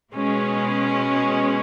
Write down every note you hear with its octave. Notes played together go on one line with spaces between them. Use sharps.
B2 G#3 C#4